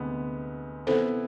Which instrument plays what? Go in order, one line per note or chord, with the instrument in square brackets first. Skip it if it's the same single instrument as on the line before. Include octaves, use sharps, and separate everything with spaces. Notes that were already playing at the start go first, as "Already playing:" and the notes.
Already playing: [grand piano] D2 C3 G#3 B3
[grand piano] C3 E3 B3 E4 [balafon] A4 C5